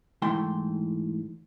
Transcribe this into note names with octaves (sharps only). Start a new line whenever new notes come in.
G#2 E3 A3 E4 G5 C6